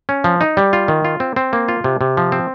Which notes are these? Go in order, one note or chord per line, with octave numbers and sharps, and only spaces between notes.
C#4
F3
D#4
G3
F4
D#3
F4
C4
C4
A#3
F4
C3
C3
F3
C4